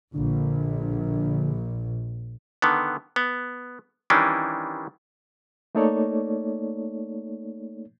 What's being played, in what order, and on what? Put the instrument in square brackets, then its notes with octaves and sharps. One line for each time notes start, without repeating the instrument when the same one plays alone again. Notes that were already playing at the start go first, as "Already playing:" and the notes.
[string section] A#1 [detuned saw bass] D3
[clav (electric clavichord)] D3 D#3 B3
B3
D#3 E3 G3 C#4 D4
[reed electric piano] A3 A#3 D#4 A4 C#5 D5